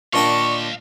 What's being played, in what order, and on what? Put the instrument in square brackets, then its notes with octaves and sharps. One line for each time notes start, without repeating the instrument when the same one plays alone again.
[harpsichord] A#2 D4 G5 [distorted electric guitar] D#5 F5 [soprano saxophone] C#6